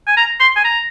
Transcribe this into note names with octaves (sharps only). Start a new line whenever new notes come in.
G#5
A#5
C6
G#5
A#5